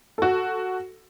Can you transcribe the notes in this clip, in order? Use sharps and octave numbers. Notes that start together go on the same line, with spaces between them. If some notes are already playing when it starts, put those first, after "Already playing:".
F#4 A4